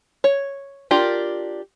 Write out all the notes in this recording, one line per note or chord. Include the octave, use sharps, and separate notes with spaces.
C#5
D4 F4 G4 A#4